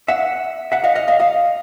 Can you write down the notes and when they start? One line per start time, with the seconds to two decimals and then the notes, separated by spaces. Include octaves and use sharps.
0.08 E5 F#5
0.72 E5 F#5
0.84 D#5 F5
0.95 D#5 F5
1.08 D#5 F5
1.20 D#5 F5